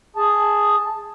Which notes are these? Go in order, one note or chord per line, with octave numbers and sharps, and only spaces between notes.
G#4 A5